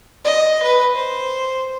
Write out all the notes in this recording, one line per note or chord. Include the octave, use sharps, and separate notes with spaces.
D#5
B4
C5